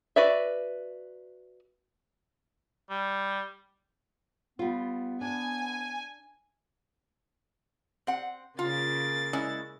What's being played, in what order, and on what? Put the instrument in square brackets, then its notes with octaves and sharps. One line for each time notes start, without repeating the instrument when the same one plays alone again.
[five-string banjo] F#4 B4 D5 E5
[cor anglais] G3
[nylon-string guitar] G3 F4 [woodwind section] B3
[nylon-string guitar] D4 [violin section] G#5
[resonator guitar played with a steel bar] C4 F#5
[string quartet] C#3 A#3 A6 [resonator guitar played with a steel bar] F4
[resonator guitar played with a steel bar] G#3 C#4 E4